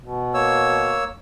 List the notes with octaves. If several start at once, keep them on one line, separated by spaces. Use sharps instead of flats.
B2
A#3 C#5 E6